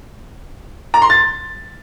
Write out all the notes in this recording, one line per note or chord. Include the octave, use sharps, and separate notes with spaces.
A#5
C6
A6